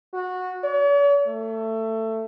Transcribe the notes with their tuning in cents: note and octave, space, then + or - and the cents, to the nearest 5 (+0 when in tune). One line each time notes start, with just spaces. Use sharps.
F#4 -15
C#5 +45
A3 +20